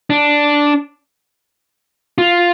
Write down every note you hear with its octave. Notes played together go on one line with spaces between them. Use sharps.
D4
F4